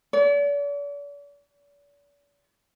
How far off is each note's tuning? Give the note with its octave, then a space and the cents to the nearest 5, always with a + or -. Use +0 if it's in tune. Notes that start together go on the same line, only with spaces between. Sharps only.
D5 -45